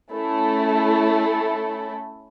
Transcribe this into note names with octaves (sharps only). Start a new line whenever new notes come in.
A3 C#4 E4 A4